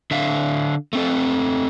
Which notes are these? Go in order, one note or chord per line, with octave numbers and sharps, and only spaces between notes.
D3 E5 F5
A3 C4 A4